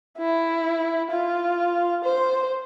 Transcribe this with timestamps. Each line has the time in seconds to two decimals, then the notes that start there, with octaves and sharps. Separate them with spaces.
0.18 E4
1.11 F4
2.04 C5